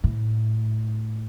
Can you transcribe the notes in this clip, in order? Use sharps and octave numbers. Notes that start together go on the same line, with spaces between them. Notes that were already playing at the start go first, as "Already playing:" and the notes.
A2